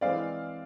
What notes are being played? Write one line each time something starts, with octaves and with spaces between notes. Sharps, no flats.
E3 G#3 C4 D5 F5